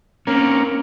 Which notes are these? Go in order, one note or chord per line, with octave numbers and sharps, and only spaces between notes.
A#3 C4 C#4